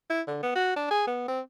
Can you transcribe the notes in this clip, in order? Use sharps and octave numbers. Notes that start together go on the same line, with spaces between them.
E4
D3
B3
F#4
D4
G#4
B3
C4